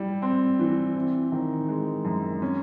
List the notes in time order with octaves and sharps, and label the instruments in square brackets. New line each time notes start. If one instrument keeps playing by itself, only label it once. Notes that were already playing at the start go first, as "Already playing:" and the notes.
Already playing: [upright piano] G3 E4
C4
E3
C4
D#3
G#3
F#2
C#4